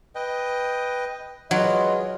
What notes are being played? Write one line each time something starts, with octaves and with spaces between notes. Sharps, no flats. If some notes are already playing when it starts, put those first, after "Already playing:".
B4 D#5 G5
F#3 G#3 E4 F4 B4 D#5